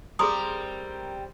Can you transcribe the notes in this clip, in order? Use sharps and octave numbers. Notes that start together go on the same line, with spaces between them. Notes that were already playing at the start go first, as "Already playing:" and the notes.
G3 C4 G#4 A#4 C6 D#6